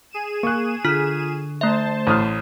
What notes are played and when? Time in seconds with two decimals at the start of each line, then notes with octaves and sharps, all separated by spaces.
0.11 G#4 D#7 E7
0.43 A#3 C#6 F#6
0.85 D3 F4 F6 B6
1.61 A3 C5 E5 A5
2.07 A1 D#6 F6